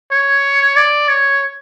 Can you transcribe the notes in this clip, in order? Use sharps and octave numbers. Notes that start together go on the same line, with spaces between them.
C#5
D5
C#5